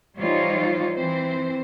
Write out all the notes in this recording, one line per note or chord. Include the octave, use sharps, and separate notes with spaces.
E3 G3 D#4 F4 C5 C#5
E3 C4 C5